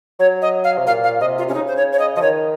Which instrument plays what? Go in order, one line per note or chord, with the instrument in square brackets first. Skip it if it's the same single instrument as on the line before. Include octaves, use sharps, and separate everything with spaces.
[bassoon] F#3 [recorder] C#5
[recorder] D#5
F5
[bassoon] C3
[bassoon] A#2 [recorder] F5
[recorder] F5
[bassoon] C3 [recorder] D#5
[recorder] F4
[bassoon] C3 [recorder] C#4
[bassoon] C#3 [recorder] D#4
[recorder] C5
C#5
C#5
D#5
[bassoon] F3 [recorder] D#5
[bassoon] D#3 [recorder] C#5